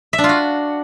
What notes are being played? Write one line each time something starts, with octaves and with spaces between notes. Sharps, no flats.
E5
D4
F4
F#4